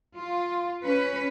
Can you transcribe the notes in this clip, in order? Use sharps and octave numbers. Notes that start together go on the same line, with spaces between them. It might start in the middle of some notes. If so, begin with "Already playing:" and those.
F4
C#4 B4